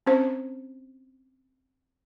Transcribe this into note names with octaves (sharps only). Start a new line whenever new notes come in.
C4 C#4 C5